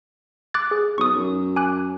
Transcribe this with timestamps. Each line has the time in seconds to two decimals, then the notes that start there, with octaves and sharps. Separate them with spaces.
0.54 D6 F#6 A6
0.71 G#4
0.98 B1 C#6 D#6
1.16 F#2
1.56 G#5 D6 F#6